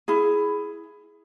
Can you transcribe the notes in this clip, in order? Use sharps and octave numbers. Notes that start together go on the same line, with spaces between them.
E4 G#4